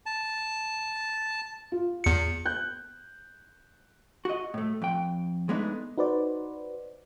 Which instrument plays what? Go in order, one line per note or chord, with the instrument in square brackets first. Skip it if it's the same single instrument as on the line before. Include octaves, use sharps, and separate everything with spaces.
[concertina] A5
[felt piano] F4
[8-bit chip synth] E2 C#7
[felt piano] F#6 G6
[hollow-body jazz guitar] F#4 D#5
A2 A3
F2 G5
G#3 A3 B3 D4 D#4
[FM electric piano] D#4 F#4 B4 C5 D5